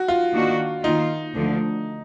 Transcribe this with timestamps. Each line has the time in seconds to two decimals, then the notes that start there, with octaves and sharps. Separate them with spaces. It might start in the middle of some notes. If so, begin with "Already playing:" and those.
Already playing: F#4
0.08 F4
0.33 D#3 A#3 D4 F#4
0.84 D#3 A#3 D#4 F4
1.34 D2 D3 F3